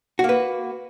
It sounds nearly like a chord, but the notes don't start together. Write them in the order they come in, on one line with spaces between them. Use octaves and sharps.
F#4 A#3 B4